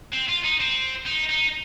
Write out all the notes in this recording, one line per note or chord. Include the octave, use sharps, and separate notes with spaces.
C4
F4
D#4
C4
D#4
D#4